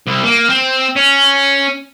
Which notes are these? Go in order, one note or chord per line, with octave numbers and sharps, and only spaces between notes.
C2
A#3
C4
C#4